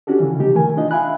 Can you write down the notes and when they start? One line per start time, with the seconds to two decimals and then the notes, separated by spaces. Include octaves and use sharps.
0.07 C#4 D4 F#4 G4 A4
0.20 C#3 E3
0.39 C3 F3 A3 D#4 G4
0.54 D#3 E3 A3 A#4 G#5
0.77 D4 D#4 F4 D#5
0.91 E5 F5 G5 G#5 B5 F#6